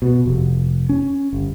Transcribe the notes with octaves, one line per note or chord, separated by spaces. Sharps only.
B2
F1
C#4
G1